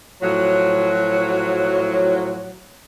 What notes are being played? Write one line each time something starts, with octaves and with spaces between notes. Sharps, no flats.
A2 F3 F#3